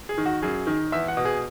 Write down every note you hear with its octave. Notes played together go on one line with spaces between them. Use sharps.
G#4
D#3
F#4
F#2 G#4
D#3
E2 E5
F#5
B2
G#4